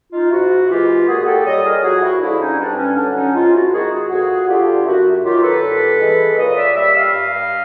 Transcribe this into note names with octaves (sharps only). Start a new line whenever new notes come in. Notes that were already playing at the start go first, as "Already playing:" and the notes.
D#4 F4
G#2 E4 F#4
E3 G#3 F4 G4
A#2 F#4 G#4
G4 A4
G3 C#5 D#5
G#4 A#4
F2 F#4 G#4
E4 F#4
D3 F3 G#3 D4 E4
C#4 D#4
G2 D4
C#4
D3 F#3 D4
C#4 D#4
G#2 D#4 F4
E4 F#4
D#3 G#3 F#4 G#4
F#4 G#4
F2 F#4 G#4
D3 G3 F4 G4
F#2 E4 F#4
D#3 F#3 F4 G4
A4 B4
G2
E3 G#3
A#2 C#5 D#5
D5 E5
G3 D5 E5
D#5 F5
G2